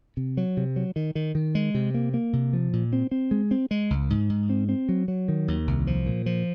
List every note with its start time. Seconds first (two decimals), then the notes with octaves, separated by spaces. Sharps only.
0.17 C3
0.37 F#3
0.57 C3
0.76 F#3
0.96 D#3
1.15 D#3
1.35 D#3
1.55 G#3
1.74 C3
1.94 A#3
2.14 A#3
2.33 C3
2.53 F3
2.73 A#2
2.93 C4
3.11 C4
3.31 G#3
3.51 C4
3.71 G#3
3.90 C#2
4.10 G#2
4.30 G#2
4.49 C4
4.69 C4
4.89 F#3
5.08 F#3
5.28 D#3
5.48 D#2
5.67 C2
5.87 F3
6.06 A#2
6.26 F3